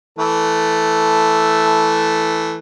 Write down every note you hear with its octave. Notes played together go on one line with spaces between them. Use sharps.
E3 A3